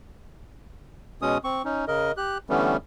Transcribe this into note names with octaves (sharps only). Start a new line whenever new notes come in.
B2 G#3 C#4 D#6
C4 C#6
C#4 D#4
C#3 A#4 D#5
G4 F#6
D3 E3 G3 A3 B3 C#4